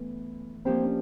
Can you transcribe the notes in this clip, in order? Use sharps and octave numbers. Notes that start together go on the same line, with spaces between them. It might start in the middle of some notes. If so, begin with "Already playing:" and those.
Already playing: E3 A3 B3 C#4
F3 A#3 C4 D4 G4 C5
C#4